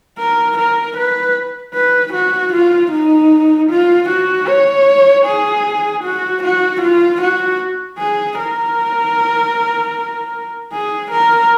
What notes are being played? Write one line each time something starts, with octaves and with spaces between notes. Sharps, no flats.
A#4
A#4
B4
B4
F#4
F4
D#4
F4
F#4
C#5
G#4
F#4
F#4
F4
F#4
G#4
A#4
G#4
A#4